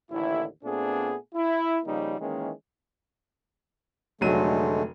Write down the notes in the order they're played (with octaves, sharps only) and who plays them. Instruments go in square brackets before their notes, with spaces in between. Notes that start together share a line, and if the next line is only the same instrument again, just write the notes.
[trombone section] A1 D#2 D3 E4
A#2 A3 B3 C4 D4 G#4
E4
C#3 F3 G3 A#3 D#4
D#3 E3 G#3 A#3 C#4
[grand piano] F1 F#3 D#7 [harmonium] D3 G#3 A3